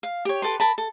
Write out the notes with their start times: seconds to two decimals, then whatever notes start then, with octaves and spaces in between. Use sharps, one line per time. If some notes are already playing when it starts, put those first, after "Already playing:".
0.03 F5
0.25 G4 C#5
0.42 G4 A4 B4 C6
0.60 A#4 A5 B5
0.78 A4